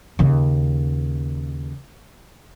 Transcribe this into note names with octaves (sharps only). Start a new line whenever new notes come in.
D#2 C#3